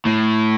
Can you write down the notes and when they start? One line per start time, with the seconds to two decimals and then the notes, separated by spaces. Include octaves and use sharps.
0.06 A2